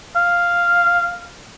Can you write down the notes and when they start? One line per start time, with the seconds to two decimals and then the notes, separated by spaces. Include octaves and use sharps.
0.16 F5